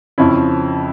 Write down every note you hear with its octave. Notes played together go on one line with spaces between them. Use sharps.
F2 C#3 F3 C#4 E4